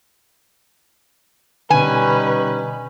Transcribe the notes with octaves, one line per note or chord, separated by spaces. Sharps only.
B2 D3 G3 C#4 D#4 B4 G#5